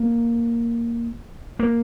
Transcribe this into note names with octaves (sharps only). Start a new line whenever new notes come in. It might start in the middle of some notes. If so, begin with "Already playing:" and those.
Already playing: A#3
A#3